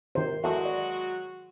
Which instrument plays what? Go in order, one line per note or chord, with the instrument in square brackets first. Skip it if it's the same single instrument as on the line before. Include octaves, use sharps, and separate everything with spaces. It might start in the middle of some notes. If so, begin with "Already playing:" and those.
[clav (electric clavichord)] C3 [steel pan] D#3 C5
[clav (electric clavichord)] E2 A4 [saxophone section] F#3 G#3 F#4
[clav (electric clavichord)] D5